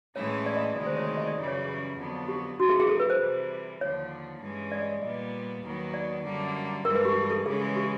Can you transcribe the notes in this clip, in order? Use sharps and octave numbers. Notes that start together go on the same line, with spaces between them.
A2 E3 G#3 C#4 E4 C#5
D5
D#5
D2 C3 D#3 G#3 D5
C5
C#5
D5
D#5
D5
F#2 C#3 E3 G3 C#5
C#5
G#4
F2 D3 F#3 B3 D4
G4
F2 C3 E3 G#3 F#4
G#4
G#4
A4
B4
C5
C3 E3 G3
D#2 D3 F3 C#5
G2 E3 G#3 C#4
D5
D#5
D5
A#2 G3 B3 D#5
D#2 D#3 F#3 B3
D5
F#2 D3 G3 A#3
G2 E3 G#3 A#4
B4
G4
G4
A4
C#3 E3 G#3 C#4 G#4
G4